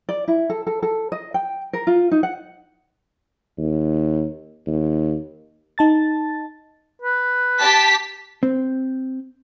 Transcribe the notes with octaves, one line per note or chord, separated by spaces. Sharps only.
D5
E4
A4
A4
A4
D#5
G5
A#4
F4
D#4
F#5
D#2
D#2
D#4 A5 A6
B4
G4 A5 B6
C4